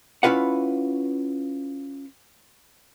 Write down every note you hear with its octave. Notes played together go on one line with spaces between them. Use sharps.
C#4 E4 F4 B4 F#5